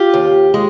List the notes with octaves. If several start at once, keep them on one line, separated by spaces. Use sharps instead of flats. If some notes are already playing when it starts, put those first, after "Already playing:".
Already playing: F4 G4
D#2
G#3